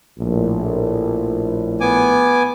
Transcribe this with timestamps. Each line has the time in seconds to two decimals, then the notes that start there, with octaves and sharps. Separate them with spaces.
0.19 A#1 A2
1.81 B3 G#5 D6